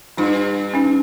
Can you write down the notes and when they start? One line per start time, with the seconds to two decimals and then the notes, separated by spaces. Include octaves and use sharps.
0.17 G2 D#4 F4
0.74 C#4 D#4